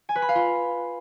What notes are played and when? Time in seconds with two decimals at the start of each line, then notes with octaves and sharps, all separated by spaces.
0.09 G#5
0.15 B4
0.22 B5
0.29 F5
0.35 F4